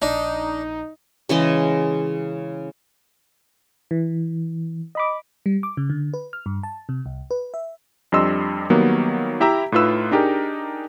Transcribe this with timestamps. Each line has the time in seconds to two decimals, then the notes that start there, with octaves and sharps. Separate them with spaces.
0.02 A#1 D4 D#4
1.29 C#3 E3 G#3 D#5
3.91 E3
4.95 D#5 B5 D6
5.46 G3
5.63 D6
5.77 C#3
5.90 D3
6.14 B4
6.33 F6
6.46 G2
6.63 A5
6.89 C3
7.06 C2
7.31 B4
7.54 E5
8.12 F2 G3 D4 D#5 C6 E6
8.70 D#3 F#3 G3 A#3 B3
9.40 E4 G4 E5 A#5 E6
9.72 A2 D#4 F4 B4 E6
10.11 D4 D#4 G4 G#4 A#4